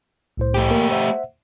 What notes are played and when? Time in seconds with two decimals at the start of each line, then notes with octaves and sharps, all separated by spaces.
0.37 C2 A2 C5
0.54 A3 G4
0.71 A#3 A#4
0.90 C5 E5 F#5